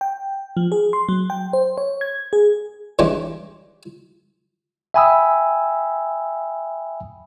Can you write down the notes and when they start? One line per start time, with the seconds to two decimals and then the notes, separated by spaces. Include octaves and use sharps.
0.01 G5
0.57 F3
0.72 G#4
0.93 C6
1.09 F#3
1.30 G5
1.53 C5
1.78 C#5
2.01 G#6
2.33 G#4
2.99 E3 G3 G#3 C#4 D4
4.94 E5 G5 G#5 B5 D#6 E6